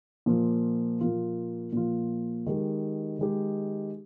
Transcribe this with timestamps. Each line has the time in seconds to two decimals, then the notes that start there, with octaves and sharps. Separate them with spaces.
0.26 A#2 F3 A#3 F4
1.01 A#2 F3 A#3 F4
1.73 A#2 F3 A#3 F4
2.46 D#3 G#3 D#4 G4
3.19 D#3 G#3 D#4 G4